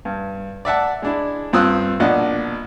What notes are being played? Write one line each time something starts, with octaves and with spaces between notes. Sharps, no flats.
G2
D5 E5 F#5 A5
G#3 D4 E4
G2 C4 F4 D#6 E6 F#6
A#1 B2 D4 D#5 F#5